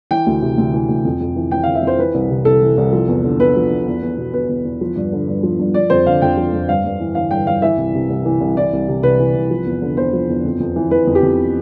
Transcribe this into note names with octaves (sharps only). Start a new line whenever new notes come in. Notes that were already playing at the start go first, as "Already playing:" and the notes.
E3 G5
D2
C3
D2
E3
D2
F2
F2
E3
E3 G5
F2 F5
E5
F2 C5
E3 B4
C2
C3
C2 A4
E3
C2
F3
E2
D3
E2 B4
F3
E2
E2
E2
B2
B2 B4
E2
E2
F3
G2
D3
G2
F3
G2
F3 D5
F2 C5
D3 F5
F2 G5
F3
F2
G2 F5
G2
E3
E3 F5
G2 G5
G2 F5
E3 E5
C2
C3
C2
E3
C2
E3 D5
C2
C3
C2 B4
E3
C2
F3
E2
D3
E2 C5
F3
E2
F2
F2
E3
E3 B4
F2
G4
F2